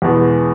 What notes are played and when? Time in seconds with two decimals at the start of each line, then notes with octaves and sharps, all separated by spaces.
0.02 E2 B2 G#3